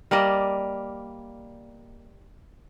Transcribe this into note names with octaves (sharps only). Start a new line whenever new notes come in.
G3 A#3 D5 D#5